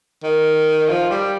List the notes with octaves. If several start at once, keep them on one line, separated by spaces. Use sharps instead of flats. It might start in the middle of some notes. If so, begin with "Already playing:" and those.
D#3
F3
G3